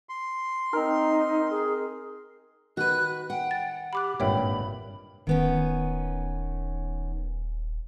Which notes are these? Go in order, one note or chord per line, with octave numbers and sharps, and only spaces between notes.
C6
C4 D#4 A#4
G#4
D#3 F#4 B4 F#6
F#5 G5
A6
G4 B5 D6 F#6
G#1 G2 A#2 C#5 E5 G5 B5
D#1 D#3 B3 C#4